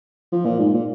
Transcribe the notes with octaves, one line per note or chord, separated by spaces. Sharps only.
F3
A#2
G#2
A#2